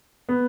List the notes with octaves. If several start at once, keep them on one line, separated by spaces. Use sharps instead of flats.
B3